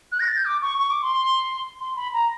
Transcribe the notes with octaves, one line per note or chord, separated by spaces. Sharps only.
F#6
A#6
A6
G6
D6
C#6
C#6
D6
C6
C6
B5
A#5